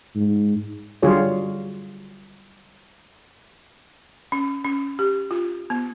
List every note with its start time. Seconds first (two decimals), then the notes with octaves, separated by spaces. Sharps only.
0.15 G#2
1.02 D3 F#3 G3 F4 G#4 C#5
4.32 C#4
4.65 C#4
4.99 G4
5.31 F4
5.70 B3